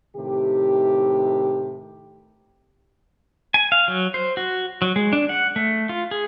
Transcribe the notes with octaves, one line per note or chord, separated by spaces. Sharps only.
A2 C3 D#3 G4
G#5
F5
F#3
C5
F#4
F#3
G#3
D4
F#5
A3
F4
G#4